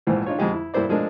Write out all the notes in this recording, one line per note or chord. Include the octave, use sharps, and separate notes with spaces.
A#1 G#2 E3 F3
D4 D#4 F4 C#5
F2 D3 G#3 G4
E4
G2 A#3 E4 C5 D5
F3 G#3 A3 D4 A#4